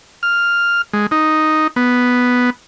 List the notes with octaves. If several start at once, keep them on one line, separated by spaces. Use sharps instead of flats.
F6
G#3
D#4
B3